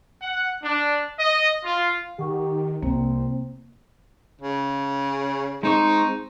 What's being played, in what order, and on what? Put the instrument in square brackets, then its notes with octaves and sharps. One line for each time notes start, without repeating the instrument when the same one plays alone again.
[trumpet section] F#5
D4
D#5
F4
[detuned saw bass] D#3 [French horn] G4 [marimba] F#5 C#6
[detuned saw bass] C2 [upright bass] C3 [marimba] A#3 [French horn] C4
[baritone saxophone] C#3
[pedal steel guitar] G#3 C4 C#6 [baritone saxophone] D#4